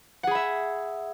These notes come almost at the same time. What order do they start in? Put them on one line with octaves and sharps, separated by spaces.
F#5 G#4 B5 E5